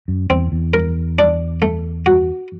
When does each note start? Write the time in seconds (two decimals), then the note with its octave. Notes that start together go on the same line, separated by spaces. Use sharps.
0.08 F#2
0.30 E2 C4
0.52 E2
0.74 A#4
1.19 D4
1.62 A3
2.06 F#4